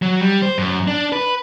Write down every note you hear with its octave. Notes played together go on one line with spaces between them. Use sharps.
F#3
G3
C5
F#2
D4
B4